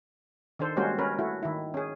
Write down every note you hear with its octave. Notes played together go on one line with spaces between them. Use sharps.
D#3 D4 A4 C5
G3 G#3 A#3 C#4 F#4 C5
C#4 A#4 B4
A3 E4 F#4
D#3 E4
C#4 G#4